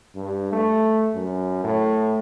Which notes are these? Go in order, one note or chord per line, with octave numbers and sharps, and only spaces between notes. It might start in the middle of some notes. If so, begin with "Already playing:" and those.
G2
A3
F#2
A2